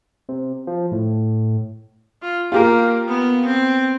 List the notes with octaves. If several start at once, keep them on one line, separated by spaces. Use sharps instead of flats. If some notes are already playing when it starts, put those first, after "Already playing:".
C3
F3
A2
F4
A#3 F4 G4 A#4
B3
C4